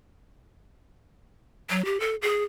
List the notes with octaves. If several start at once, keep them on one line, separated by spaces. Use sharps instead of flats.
F#3
G4
A4
G#4